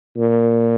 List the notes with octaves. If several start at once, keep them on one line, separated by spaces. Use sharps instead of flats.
A#2